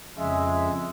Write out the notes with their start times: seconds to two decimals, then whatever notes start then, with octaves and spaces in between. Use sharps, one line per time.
0.18 F2 C#3 G#3 E5